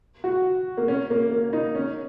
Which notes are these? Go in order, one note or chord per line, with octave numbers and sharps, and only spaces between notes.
F#4
A#3
C#4
A#3
A#3
D#4
C#4